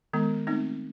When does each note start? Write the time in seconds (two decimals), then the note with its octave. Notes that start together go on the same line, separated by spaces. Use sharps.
0.13 D#3 G#3 B3
0.47 A3 C4 D#4